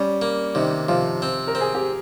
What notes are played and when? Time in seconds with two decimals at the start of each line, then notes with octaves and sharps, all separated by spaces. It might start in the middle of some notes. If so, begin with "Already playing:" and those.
Already playing: G3 C#4
0.22 A#3
0.55 C3 D#3 D#4
0.88 C3 F3 F4
1.22 C4
1.47 A#4
1.55 C4
1.61 G#4
1.75 G4